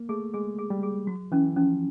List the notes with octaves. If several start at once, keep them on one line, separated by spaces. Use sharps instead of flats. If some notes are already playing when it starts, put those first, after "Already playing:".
Already playing: A#3
A3 G#4
G#3 G#4
G#4
G3
G#4
F#3 F#4
E3 C#4
F3 C#4